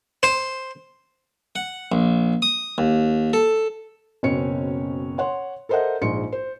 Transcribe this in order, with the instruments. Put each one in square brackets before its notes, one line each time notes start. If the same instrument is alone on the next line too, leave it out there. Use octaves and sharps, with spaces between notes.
[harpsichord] C5
F#5
A#1
D#6
D#2
A4
[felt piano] F#1 B2 C4 C#4 C#5 C#7
C#5 F#5 C6
A4 A#4 C5 D#5 E5 F#5
A#1 G#2 C6 C#7
C5